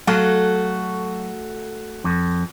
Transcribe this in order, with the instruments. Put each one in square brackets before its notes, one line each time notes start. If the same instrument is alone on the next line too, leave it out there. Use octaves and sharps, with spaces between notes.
[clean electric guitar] F#3 F5 [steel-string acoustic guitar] A3 F#4 A4
[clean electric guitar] F2